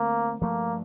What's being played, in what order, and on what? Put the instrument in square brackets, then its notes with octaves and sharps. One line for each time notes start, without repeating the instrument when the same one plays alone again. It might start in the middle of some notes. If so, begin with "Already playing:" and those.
Already playing: [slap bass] D3 A3 C4 [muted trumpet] A#3
[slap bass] G2 F3 A3 [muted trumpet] A#3